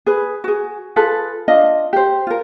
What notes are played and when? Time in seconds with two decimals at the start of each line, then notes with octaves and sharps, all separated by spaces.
0.06 G#4 B4
0.44 F#4 G#4
0.96 F4 G#4 A4 B4
1.48 D4 F4 D#5
1.93 G4 C5
2.27 F4 A#4